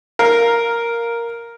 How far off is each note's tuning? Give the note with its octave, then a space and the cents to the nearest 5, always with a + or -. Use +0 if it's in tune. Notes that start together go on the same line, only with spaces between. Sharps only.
A#4 +0 F5 +0